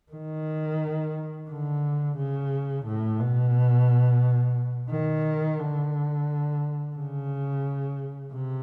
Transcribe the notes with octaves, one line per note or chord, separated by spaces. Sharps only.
D#3
D3
C#3
A2
B2
D#3
D3
C#3
C3